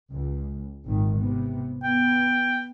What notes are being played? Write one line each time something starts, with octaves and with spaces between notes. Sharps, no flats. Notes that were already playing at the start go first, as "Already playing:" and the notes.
C#2
G#1 A#2 D#3
C3 B3
B3 G5